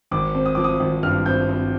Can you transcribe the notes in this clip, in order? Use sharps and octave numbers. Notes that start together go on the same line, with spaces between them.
G#1 D6
C4
D#6
F3 D6
D#6
G#1
G2 F6
C4 G6
C4